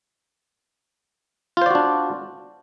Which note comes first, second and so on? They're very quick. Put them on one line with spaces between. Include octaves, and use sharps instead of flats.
F4 C5 D5 F#4 D4